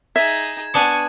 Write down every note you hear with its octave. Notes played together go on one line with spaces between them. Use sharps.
D#4 G#4 E5 G#6 E7
B3 D4 G#5 C#6